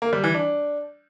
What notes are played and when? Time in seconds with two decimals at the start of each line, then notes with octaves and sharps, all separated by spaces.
0.02 A#3
0.13 G3
0.24 E3
0.34 D4